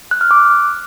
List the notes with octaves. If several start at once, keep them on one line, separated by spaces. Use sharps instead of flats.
F#6
F6
D6